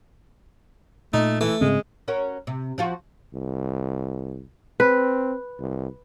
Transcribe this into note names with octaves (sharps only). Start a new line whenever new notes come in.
A#2 A3 D#4
E3 A3
G#2 C#3 G#3 C4
C#4 F#4 A#4
C3
F3 F4 F#4
C2
C4 B4
C2